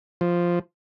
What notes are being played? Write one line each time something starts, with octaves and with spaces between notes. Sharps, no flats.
F3